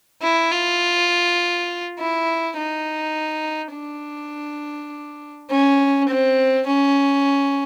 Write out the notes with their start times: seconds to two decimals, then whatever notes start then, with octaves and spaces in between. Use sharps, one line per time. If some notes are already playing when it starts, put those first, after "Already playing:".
0.22 E4
0.51 F4
1.98 E4
2.56 D#4
3.73 D4
5.50 C#4
6.08 C4
6.66 C#4